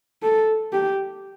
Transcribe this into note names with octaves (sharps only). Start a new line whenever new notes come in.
A4
G4